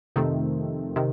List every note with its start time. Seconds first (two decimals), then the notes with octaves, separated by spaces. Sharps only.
0.16 F2 C3 D#3 A3 C4
0.96 C3 D#3